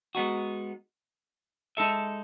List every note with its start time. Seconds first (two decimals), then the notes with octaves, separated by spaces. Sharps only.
0.15 G#3 B3 D#4 F#4
1.77 G#3 D#4 A4 E5